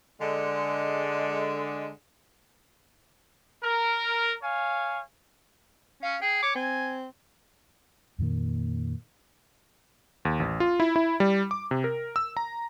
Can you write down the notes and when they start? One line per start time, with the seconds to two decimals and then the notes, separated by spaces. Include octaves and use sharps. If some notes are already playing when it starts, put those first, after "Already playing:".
0.21 D3 G#3
3.61 A#4
4.42 C#5 F5 G#5
6.03 C#4 F5
6.21 G#4 G5
6.43 C#5 D6
6.55 C4 G#5
8.18 F2 A#2 D#3 A#3
10.25 D#2
10.40 A1
10.60 F4
10.80 E4
10.96 E4
11.20 G3
11.51 D6
11.71 C3
11.84 A#4
12.16 E6
12.37 A#5